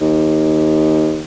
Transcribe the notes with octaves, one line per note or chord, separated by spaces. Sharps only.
D#2